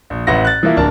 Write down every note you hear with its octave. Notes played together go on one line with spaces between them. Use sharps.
A#1
A1 E4 B4 F#5 A#6
F#6 A6
E3 F3 A#3 E4
D1 D4 A#4 A5